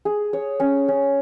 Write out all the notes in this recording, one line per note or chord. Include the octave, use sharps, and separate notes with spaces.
G#4
C#5
C#4
C#4